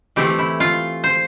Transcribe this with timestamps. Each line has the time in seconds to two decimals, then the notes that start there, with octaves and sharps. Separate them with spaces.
0.16 E3 A3 C4 E4 G4
0.39 E4
0.60 F4
1.04 C5